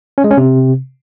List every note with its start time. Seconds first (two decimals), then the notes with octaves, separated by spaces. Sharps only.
0.18 C#4
0.24 G#3
0.31 C#4
0.37 C3